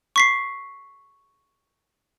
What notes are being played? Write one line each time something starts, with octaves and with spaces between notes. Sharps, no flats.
C#6 B6 C7